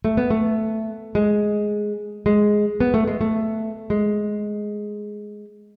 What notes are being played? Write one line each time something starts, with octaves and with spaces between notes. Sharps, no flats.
A3
B3
A3
G#3
G#3
B3
A3
G#3
A3
G#3